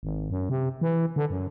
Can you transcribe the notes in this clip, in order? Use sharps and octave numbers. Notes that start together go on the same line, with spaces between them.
G#1
F#2
C3
E3
D3
F#2